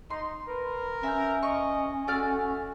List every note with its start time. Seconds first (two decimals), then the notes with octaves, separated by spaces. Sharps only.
0.10 D#4 C6
0.48 A#4 B4
1.03 C#4 E5 F6 G6
1.43 D#5 C#6
2.08 A3 F#4 D5 F6